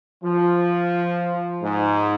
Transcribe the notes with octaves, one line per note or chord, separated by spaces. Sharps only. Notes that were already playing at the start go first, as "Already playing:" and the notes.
F3
G#2